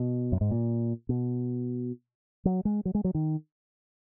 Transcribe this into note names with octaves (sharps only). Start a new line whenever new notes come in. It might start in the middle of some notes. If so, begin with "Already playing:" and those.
Already playing: B2
F#2
G#2
A#2
B2
F#3
G#3
F#3
G#3
F#3
D#3